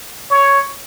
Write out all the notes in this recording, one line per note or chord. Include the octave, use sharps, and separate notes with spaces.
C#5